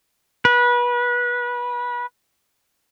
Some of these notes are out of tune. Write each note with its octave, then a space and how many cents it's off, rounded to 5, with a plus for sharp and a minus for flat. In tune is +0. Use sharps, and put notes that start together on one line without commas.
B4 -25